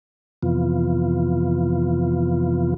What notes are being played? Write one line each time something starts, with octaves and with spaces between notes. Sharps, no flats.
F2 C3 E3 F3 B3 F4